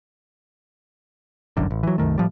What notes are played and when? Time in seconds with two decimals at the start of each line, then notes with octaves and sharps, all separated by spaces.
1.57 G1 C2 F#2 D3
1.71 A1
1.83 E3 F#3
1.98 C2 F#2 D#3 A3
2.18 A2 F3 G3